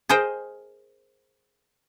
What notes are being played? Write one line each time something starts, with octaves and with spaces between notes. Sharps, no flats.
G#4 A#4 C5 D#5 G5